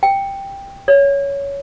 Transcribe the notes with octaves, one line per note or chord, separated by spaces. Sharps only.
G5
C#5